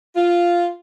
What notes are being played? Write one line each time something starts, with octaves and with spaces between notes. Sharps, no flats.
F4